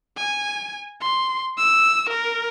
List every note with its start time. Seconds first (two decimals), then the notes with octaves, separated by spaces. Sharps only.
0.18 G#5
1.01 C6
1.58 E6
2.10 A#4